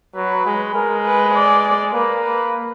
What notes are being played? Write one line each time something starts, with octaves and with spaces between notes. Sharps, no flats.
F#3 B4
G#3
G#3 A#4
B4
D5
A#3 B4
B4